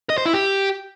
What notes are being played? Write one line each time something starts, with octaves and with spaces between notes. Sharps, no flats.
D#5
C5
E4
G4